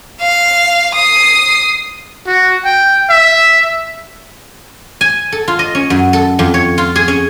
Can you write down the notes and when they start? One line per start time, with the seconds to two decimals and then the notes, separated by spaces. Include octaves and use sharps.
0.21 F5
0.95 D#6 C7
2.27 F#4
2.65 G5
3.09 E5
5.01 G#5
5.32 A4
5.48 F4
5.59 D#5
5.75 C#4
5.90 F#2
6.13 A4
6.39 F2
6.54 C#5
6.78 F4
6.96 G#4
7.08 C#4